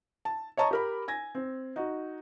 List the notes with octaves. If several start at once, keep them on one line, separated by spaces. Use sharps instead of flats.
A5
C#5 D#5 A5 A#5 C#6
G4 A#4 B5
G#5 G#6 A#6
C4
D#4 F#4